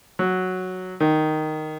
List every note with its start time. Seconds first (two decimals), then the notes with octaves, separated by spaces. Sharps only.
0.19 F#3
1.00 D#3